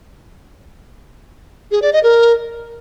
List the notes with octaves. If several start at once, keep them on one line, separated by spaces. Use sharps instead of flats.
G#4
D5
D#5
A#4